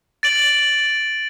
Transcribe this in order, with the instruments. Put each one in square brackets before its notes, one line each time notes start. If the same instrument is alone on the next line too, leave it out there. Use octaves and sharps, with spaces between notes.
[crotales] A6 D7 F#7